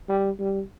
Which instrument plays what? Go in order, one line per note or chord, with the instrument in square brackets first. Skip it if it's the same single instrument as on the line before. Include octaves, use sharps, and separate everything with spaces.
[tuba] G3
G3